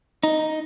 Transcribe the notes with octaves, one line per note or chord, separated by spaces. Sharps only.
D#4